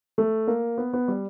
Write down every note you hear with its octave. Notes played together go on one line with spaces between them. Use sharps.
A3
A#3
B3
B3
G3